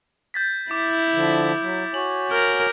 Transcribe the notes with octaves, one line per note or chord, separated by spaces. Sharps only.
G6 A6 B6
E4 D6
D3 F3
F#3
F#4 C#5 G#5 F#7
A#4 F6 G6